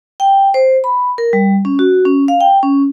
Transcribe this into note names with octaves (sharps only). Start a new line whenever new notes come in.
G5
C5
B5
A#4
G3
C#4
F#4
C#4
F5
G5
C#4